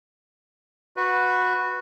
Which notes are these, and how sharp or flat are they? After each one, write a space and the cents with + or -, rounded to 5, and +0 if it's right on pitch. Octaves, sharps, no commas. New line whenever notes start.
F#4 -15 B4 +0